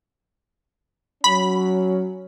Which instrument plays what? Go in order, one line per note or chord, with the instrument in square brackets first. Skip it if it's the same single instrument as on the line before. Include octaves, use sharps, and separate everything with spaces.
[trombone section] F#3 C#4 [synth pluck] B5